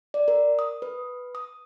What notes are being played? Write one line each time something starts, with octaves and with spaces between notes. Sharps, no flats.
D5
A#4
D#6
B4
D#6